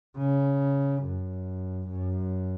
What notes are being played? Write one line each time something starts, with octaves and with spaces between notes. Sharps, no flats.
C#3
F#2
F#2